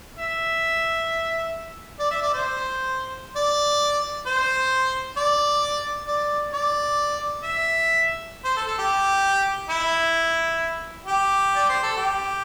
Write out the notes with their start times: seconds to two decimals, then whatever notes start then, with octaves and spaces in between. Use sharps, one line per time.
0.18 E5
1.99 D5
2.11 E5
2.22 D5
2.34 C5
3.36 D5
4.26 C5
5.17 D5
6.07 D5
6.53 D5
7.43 E5
8.44 C5
8.57 A4
8.67 A4
8.78 G4
9.69 E4
11.06 G4
11.55 D5
11.69 C5
11.83 A4
11.97 G4